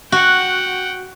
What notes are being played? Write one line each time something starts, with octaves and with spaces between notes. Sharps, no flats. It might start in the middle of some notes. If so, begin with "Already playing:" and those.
F#4 F#5 G5